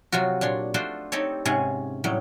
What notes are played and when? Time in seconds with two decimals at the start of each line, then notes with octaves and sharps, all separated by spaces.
0.12 C3 F#3 F4 F#4
0.41 A#2 D4 C#5 C6
0.74 A3 D4 F4 F#4 A4 C5
1.12 C4 D#4 G4 A4 C#5
1.45 G#2 C3 C#4 G#4 F#5
2.04 A2 F#3 G3